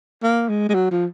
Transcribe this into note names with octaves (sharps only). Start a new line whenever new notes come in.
A#3
G#3
G#3
F#3
F3